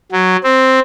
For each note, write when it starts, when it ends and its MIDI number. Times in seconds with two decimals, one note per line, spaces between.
0.12 0.37 54
0.44 0.80 60